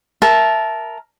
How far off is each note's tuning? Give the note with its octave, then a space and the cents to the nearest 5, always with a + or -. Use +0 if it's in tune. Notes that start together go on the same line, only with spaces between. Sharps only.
A#4 +0 E5 +5 A5 -15